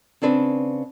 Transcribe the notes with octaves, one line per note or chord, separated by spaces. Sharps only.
C#3 C4 D4 B4